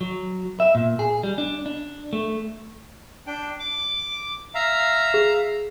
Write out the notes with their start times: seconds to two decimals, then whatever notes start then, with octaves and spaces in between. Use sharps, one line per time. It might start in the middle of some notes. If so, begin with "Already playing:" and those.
0.01 F#3
0.60 E5
0.75 A#2
0.99 G#4
1.23 G3
1.38 D4
1.66 D4
2.13 A3
3.27 D4 G5
3.60 D6
4.55 E5 F5 A#5
5.14 G#4